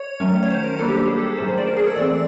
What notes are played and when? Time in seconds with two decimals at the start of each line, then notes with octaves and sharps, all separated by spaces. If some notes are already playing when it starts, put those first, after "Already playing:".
Already playing: C#5
0.20 D#3 F#3 A3 C#4
0.43 C#5
0.50 C5
0.64 A#4
0.79 G3 A#3 D4 A4
0.88 G4
0.99 G4
1.08 G#4
1.19 A4
1.37 D#3 F#3 A3 C#4 C5
1.48 C5
1.58 D5
1.67 A#4
1.77 G#4
1.87 A4
1.96 E3 A3 C4 D5